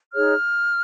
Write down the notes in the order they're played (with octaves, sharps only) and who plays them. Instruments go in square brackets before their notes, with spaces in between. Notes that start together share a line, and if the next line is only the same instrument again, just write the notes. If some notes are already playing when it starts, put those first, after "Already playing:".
[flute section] D#4 G#4 C#5 F6